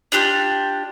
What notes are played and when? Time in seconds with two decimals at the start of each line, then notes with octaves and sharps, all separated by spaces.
0.12 D4 F4 G4 F#6